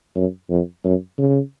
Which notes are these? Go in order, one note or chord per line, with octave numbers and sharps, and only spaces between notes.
F#2
F2
F#2
C#3